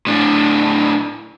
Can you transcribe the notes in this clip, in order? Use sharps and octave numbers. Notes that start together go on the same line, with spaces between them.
A2 D4